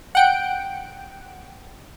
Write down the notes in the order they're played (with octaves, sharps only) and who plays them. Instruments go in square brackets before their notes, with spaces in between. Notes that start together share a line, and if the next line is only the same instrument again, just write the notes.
[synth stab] F#5 G5 D7